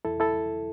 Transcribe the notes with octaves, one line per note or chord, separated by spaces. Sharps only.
E2 E4 A4
E4 A4